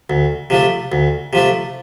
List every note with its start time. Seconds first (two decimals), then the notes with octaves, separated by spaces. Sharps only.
0.10 D2
0.50 C3 F3 A3
0.92 D2
1.33 C3 F3 A3